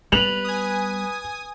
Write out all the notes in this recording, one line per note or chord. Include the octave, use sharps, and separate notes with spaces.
G3 B3 B4 F7 F#7
G#5 D#6